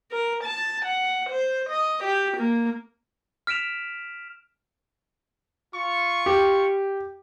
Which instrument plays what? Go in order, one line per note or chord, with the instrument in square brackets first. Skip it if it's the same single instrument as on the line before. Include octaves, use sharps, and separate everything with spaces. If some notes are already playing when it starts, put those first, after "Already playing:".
[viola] A#4
A5
F#5
C5
D#5
G4
A#3
[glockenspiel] F6 B6 D7 E7 F7
[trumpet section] F4 C#6
[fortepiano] G4